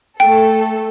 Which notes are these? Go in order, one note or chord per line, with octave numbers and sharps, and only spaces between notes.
A3 A4 G5